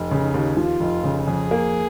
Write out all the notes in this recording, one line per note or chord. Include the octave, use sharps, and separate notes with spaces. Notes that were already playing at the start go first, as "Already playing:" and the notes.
Already playing: F1
C#3
D#4
D#2
F3 F4
F1
C#3
F2 G#4
A#3